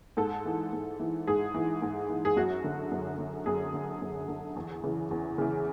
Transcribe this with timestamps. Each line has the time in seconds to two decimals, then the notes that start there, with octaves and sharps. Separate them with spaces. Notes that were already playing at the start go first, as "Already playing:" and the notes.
0.17 G#2 A4
0.45 E3
0.73 G#2
1.00 E3
1.27 G#2 G#4
1.54 E3
1.82 G#2
2.09 E3
2.25 G#4
2.36 F#2 F#4
2.64 D3
2.91 F#2
3.19 D3
3.46 F#2 G#4
3.74 D3
4.02 F#2
4.28 D3
4.56 E2
4.83 C#3 E3
5.11 E2
5.38 C#3 E3